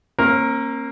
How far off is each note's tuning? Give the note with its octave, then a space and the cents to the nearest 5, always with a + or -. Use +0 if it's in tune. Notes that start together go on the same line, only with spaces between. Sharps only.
A#3 +0 C#4 -45 A#4 +0